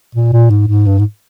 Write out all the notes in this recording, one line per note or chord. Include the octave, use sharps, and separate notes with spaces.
A#2
A#2
G#2
G#2
G2
G#2